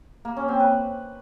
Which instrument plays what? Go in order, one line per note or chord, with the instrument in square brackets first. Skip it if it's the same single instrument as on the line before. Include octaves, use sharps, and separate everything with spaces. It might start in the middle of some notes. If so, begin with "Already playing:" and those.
[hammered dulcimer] A#3
C#4
C4
B4